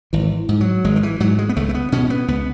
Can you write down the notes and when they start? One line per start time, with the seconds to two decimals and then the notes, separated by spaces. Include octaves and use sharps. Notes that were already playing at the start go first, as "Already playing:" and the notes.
0.13 G#1 E3
0.49 G#2
0.61 F#3
0.84 G#1 G#3
0.96 D#3
1.03 E3
1.20 G#2 F#3
1.39 G#3
1.49 B3
1.56 C#2 A3
1.69 A3
1.74 B3
1.92 B2 C#4
2.10 B3
2.28 C#2 B3